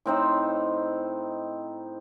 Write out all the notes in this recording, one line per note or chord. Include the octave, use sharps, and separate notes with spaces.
A2 C4 D#4 C5